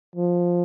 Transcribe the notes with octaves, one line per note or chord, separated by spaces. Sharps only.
F3